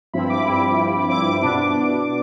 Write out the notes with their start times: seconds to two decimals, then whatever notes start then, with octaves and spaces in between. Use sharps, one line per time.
0.14 G2 F3 C4 E4 B5
0.30 D6
0.46 G2 F3 C4 E4
0.77 G2 F3 C4 E4
1.09 G2 F3 C4 E4 D6
1.41 B2 B3 D4